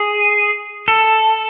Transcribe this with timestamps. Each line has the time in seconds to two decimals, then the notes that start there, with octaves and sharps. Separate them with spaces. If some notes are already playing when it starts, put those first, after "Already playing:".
Already playing: G#4
0.88 A4